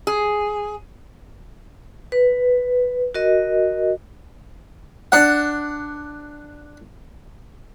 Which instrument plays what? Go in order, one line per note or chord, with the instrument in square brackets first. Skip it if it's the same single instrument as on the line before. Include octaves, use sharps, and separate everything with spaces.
[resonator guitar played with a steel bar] G#4
[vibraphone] B4
F#4 A#4 D#5
[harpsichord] D4 F#5